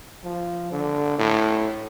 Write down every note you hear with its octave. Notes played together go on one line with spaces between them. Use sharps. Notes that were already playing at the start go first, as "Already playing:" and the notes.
F3
D3
A2